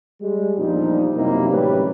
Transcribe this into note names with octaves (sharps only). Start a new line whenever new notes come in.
G3 G#3
E2 A#2 F3 G3 D4 D#4
F#2 C3 G3 A#3 D#4 E4
A1 F#2 C3 G3 C#4 B4